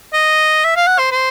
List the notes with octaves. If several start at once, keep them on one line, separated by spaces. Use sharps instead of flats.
D#5
E5
F5
F#5
C5
C5